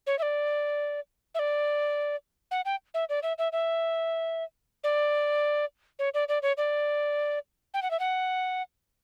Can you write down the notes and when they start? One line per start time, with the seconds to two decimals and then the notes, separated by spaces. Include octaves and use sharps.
0.07 C#5
0.19 E5
0.22 D5
1.35 E5
1.39 D5
2.51 F#5
2.65 G5
2.94 E5
3.09 D5
3.23 E5
3.38 E5
3.52 E5
4.84 D5
5.99 C#5
6.14 D5
6.28 D5
6.42 C#5
6.57 D5
7.74 G5
7.82 F#5
7.91 E5
7.99 F#5